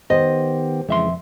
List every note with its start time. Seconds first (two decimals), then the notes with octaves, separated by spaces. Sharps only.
0.10 D#3 B3 G4 C5 D#5
0.89 F2 C#3 E3 G#3 E5 C6